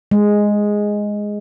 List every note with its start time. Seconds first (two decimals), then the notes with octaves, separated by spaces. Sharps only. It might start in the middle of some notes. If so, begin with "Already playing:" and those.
0.11 G#3